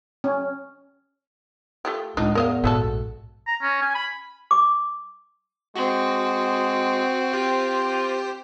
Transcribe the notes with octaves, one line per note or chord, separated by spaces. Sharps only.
C#4
A3 F4 G4
C#2 A2 D4 D#4
E2 A#4 D#5 F5
A#1 G#2 A3 F#4 A4
A#5
C#4
G#5
B5
D6
G#3 C4 F#4
F4 G4 C5